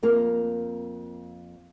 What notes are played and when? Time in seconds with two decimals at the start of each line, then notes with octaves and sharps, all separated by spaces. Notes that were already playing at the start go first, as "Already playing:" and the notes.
0.03 F2 A#3 A#4